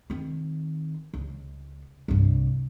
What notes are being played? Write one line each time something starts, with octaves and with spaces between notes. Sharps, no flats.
D#3 C4
C#2
C2 G2